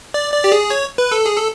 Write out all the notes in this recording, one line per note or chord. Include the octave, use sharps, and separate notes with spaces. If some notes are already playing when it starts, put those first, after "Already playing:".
D5
D5
G4
G#4
C#5
B4
A4
G#4
A4